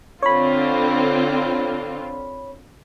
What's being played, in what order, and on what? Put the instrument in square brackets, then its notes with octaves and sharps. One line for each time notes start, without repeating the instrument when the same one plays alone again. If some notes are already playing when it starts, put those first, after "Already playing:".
[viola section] D3 C4 F4 [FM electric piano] C#5 B5